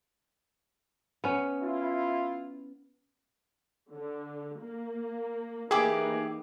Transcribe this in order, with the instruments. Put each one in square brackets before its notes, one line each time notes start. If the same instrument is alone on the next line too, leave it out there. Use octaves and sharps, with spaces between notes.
[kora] B3 C#4
[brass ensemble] E4 F4
[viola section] D3
A#3
[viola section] E3 A#3 D#4 [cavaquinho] E4 G4 D6 [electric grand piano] G#4